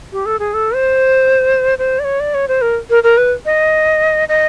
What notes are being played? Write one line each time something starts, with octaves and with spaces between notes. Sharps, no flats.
G4
A4
G#4
A4
C5
C5
D5
C#5
D5
C#5
C5
A#4
A#4
A#4
B4
D#5
D#5